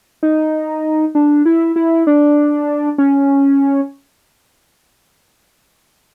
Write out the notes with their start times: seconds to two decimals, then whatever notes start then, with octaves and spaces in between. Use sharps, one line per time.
0.23 D#4
1.15 D4
1.46 E4
1.76 E4
2.07 D4
2.98 C#4